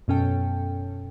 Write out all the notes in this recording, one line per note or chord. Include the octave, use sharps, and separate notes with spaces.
F#2 B2 C#4 A4 G5